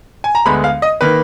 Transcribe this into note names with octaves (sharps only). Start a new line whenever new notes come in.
G#5
A#5
D2 D3 G#3 B3 B5
F5
D#5
D#3 A#3 B4